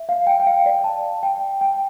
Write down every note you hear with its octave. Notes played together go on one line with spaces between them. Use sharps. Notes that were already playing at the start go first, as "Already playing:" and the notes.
Already playing: E5
F5
G5
G5
F5
D5
A5
G5
G5